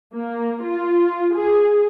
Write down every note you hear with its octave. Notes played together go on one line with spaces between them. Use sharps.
A#3
F4
G#4